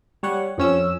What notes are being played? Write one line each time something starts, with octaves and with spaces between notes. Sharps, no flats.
G3 C#5 F#5
F2 C#4 E6